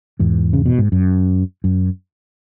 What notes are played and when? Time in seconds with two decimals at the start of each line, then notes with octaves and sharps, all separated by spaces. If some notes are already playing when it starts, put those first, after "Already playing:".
0.19 E2 G#2
0.53 C#3
0.66 B2
0.78 G#2
0.92 F#2
1.64 F#2